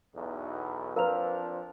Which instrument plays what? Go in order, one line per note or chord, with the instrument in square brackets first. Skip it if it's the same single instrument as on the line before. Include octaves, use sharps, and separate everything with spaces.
[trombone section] B1 E2
[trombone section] F3 C4 D4 [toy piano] A#4 B4 [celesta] F5 A#5 F7